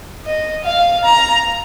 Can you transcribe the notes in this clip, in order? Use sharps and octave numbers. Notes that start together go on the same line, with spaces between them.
D#5
F5
A#5